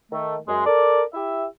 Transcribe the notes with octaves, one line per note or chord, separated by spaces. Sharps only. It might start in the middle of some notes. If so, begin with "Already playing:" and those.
D#3 A3
F#2 G#3
A4 A#4 D5
E4 G4 E5